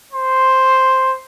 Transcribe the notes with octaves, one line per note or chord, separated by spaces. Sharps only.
C5